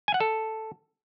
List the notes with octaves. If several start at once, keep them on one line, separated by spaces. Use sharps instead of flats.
G#5
F#5
A4